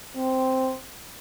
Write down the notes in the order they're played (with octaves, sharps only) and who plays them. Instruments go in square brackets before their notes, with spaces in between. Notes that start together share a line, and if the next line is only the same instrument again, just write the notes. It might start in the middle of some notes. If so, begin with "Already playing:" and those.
[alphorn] C4